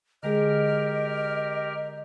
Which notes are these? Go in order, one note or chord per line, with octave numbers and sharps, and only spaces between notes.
D3 G#3 G4 G#4 A#4 D#5 F6